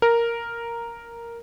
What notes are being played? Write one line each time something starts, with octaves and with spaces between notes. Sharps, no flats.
A#4